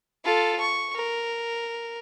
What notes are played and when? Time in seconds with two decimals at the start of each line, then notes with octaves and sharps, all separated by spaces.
0.25 F4 A4
0.60 C#6
0.95 A#4